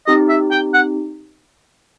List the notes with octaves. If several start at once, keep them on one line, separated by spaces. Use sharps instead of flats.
C4 D#4 G4 D#5
E5
G5
F#5